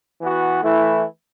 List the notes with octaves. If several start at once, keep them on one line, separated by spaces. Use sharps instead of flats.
E3 B3 F#4
E3 A3 E4